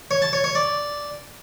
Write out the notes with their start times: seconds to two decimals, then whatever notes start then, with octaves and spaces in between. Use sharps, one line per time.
0.11 C#5
0.22 A5
0.33 C#5
0.44 C#5
0.55 D5